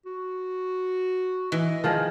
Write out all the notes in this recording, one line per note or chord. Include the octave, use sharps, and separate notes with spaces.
F#4
E3 D#5
D#3 F3 G#4